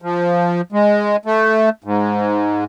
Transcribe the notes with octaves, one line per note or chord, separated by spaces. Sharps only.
F3
G#3
A3
G#2